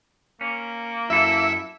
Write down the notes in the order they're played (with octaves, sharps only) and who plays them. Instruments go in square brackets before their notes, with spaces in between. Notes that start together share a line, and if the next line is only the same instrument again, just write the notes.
[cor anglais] A#3 [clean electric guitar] C#4
[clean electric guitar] F#2 A4 [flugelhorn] E4 [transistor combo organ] E5